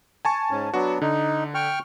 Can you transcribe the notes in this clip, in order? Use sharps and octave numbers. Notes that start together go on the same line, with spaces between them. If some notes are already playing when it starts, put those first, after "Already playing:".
G#5 A5 C#6
G#2 C#4
F#3 B3 D4 F#4
D3 D#4
G5 C#6 F6